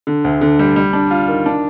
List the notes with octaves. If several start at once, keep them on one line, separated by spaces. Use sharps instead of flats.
D3
D2
D3
G3
G3
D4
F4
D#3
D4